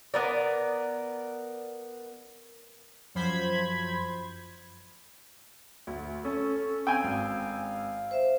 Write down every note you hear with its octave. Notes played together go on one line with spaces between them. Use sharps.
B3 A#4 D5
F#2 F3 C5 B5 G#6
D2
C#4 A4
C4 G5 G#5 E6
G#1 F5
C5 E5